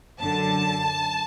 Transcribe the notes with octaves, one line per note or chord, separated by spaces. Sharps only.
F#2 D3 A5